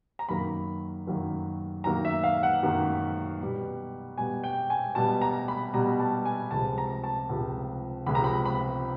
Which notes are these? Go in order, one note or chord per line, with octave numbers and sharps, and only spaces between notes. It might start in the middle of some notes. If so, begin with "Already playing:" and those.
A#5
F#2 D#3 F#3 A#3 B5
F#2 D#3 F#3 A#3
F#2 D#3 F#3 A#3 A#5
E5
F5
F#5
F#2 D#3 F#3 A#3
B2 G3 B3
B2 G3 B3 G#5
G5
G#5
B2 G3 B3 A5
A#5
B5
B2 G3 B3 A#5
A5
G#5
C#2 C3 F3 G#3 A5
A#5
A5
C#2 C3 F3 G#3
C#2 C3 F3 G#3 B5
A#5
B5
B5